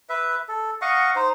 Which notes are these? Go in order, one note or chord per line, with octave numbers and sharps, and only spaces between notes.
B4 E5
A4
D#5 F5 F#5 C#6
D#4 C5